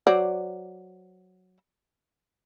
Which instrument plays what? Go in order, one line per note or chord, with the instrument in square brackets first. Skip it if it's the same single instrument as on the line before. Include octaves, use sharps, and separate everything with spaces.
[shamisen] F#3 C5 D5